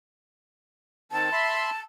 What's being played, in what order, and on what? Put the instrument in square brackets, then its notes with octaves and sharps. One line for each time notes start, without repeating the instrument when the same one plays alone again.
[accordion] D#3 C4 [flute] A5
[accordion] E5 B5 C6